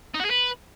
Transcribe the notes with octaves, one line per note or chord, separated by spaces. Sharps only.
D#4
F#4
G#4
B4